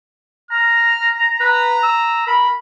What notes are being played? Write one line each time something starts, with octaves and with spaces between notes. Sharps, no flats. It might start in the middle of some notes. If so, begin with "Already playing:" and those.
A#5 F6
B4 A#5
E6
A#4 B5